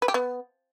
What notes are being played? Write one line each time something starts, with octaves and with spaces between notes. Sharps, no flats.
B4
G4
B3